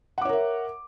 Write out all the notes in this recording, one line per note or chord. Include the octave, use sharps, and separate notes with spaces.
A#4 C#5 E5 F#5 D6